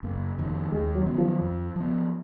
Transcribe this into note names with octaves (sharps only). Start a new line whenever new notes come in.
F#1 A#3
F2 D#3
D#2 G#3
F#3
D#3 F#3 B3
F3
F2
F3 B3